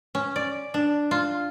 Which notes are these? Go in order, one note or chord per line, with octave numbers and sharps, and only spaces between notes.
C#4
D5
D4
F4